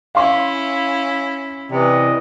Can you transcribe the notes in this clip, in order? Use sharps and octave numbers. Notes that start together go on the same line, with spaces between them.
C#4 E4 F5 C6
C3 E3 D5 D#5